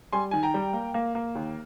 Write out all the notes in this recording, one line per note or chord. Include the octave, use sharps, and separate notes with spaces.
G3 G#5 C6
D#3 G#5
G5 A#5
G3
A#3
A#3
A#3
D#2